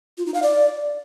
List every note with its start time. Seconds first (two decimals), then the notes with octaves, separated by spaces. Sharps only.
0.18 F4
0.26 D#4
0.34 F5
0.42 D5